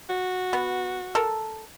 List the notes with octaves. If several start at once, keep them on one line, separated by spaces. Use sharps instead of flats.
F#4
B3
A4 A#4